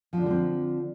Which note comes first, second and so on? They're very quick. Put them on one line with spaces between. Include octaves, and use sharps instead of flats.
F3 D4 D3 G3 C4